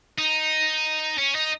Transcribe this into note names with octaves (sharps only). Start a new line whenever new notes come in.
D#4
C#4
D#4